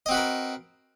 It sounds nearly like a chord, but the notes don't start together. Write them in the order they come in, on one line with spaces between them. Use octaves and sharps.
D#5 C4 F#4 B4 A#4